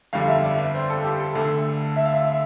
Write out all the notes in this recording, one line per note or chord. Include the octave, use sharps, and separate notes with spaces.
G1 F2 D3 G3 F5
E5
D5
B4
C5
A4
G4
A4
D2 D3 A3
E5
F5
E5